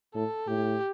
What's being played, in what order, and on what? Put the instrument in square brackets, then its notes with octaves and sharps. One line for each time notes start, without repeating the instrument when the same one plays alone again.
[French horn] A2 [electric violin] A4
[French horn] A2 [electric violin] G4